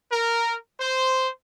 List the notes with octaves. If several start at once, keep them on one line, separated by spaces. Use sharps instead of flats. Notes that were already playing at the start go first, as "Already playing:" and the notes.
A#4
C5